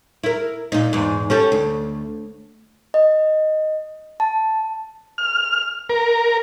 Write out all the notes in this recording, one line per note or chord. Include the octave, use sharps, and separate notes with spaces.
E4 A#4
A#2 D#4
E2 G#2
C#4 G4 A4
D2
D#5
A5
F6
A#4